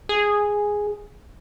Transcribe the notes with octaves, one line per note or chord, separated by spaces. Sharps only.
G#4